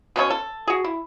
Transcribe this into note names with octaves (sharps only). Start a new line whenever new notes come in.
B2 C#4 E4 C#5
A4
F#4 G#4
E4